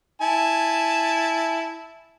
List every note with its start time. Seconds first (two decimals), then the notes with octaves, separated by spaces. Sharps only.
0.21 E4 G#5 A5